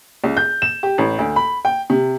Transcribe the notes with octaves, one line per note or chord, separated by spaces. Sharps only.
C#2
G6
E7
G4
A1
D2
B5
G5
C3